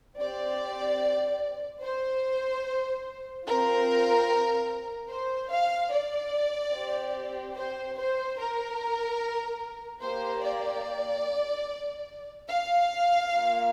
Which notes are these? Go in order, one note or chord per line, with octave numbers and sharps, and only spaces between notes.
C4 G4 D5
C5
C4 F4 A#4
C5
F5
D5
C4 G4
C5
C5
A#4
A#3 G4 C5
D5
F5
A#3 F4